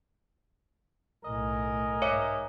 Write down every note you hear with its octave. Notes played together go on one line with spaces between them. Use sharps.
B1 A2 A#4 D#5 G#5
G#2 C#5 E5 D6 C#7